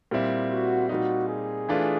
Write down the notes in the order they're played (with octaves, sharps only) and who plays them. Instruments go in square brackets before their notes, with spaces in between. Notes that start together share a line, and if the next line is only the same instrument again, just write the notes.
[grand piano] A#2 G3 C4 E4
[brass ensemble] F#4
[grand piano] A#2 G3 C4 D#4 [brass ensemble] F#4
[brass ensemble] G#4
[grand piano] E3 A3 D4 F4